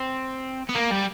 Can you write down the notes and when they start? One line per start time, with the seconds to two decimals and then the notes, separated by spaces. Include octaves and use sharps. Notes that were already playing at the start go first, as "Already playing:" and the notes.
Already playing: C4
0.69 B3
0.76 A#3
0.92 G3